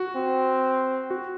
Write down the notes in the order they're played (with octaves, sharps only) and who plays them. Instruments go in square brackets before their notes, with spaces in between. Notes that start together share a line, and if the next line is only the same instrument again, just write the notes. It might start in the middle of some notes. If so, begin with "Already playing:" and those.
Already playing: [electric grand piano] F#4
[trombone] C4
[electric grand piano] F#4